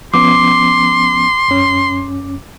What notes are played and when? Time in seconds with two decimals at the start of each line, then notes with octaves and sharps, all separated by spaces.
0.14 F3 B3 C#4 C6 D6
1.48 F#2 C#4